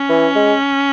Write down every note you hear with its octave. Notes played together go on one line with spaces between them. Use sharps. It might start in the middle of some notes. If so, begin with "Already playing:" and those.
Already playing: C#4
E3
G#3